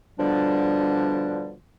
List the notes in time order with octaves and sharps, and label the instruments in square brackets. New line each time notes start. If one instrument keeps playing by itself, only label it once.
[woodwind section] B2 D3 F3 G3 D4